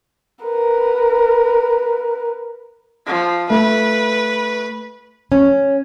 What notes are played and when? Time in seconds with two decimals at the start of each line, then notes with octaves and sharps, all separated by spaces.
0.44 A#4 B4
3.07 F3
3.50 A3 B4
5.32 C#4